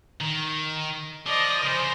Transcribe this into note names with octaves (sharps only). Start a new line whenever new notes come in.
D#3
F3 D5 D#5
C#3 C5